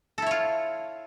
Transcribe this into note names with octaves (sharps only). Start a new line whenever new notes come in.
E4 F4 A4 C#5